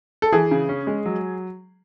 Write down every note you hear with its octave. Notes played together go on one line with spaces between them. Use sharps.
A4
E3 G#4
C#3
C#4
G#3
F#3